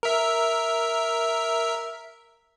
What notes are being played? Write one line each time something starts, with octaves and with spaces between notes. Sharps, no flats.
A#4 E5